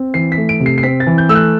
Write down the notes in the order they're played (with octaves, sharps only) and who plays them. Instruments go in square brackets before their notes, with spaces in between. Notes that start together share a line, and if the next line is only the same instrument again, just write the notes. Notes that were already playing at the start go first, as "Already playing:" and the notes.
Already playing: [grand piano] C4
E3 C7
B6
A3
D7
C3
C7
C7
C4 B6
A6
E3
G6
A3 E6
F#6